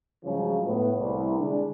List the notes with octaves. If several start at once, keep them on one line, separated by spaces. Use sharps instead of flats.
G2 C#3 F3 F#3 G#3
A2 B3
C2
D3 G#3 D4